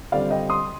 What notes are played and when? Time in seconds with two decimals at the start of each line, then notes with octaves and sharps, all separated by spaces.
0.12 D3 G3 C4 F4 D5 F5
0.31 D#5 G5
0.50 C6 D#6